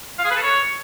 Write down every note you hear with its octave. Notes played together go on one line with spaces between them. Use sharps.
F5
G#4
B4
A4
C#5